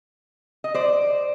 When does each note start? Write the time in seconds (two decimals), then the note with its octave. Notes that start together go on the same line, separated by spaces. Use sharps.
0.64 D#5
0.74 C5 D5